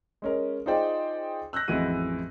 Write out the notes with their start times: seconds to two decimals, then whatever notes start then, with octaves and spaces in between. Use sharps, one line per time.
0.22 G#3 C#4 A#4
0.66 D#4 F4 G#4 C5 D5 G5
1.53 E6 F#6 G6 A#6
1.68 A1 F2 E3 G#3 F#4 D#7